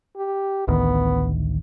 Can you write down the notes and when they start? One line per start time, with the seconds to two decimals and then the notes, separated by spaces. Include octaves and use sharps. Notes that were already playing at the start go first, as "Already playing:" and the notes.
0.17 G4
0.68 A1 D2 D#3 B3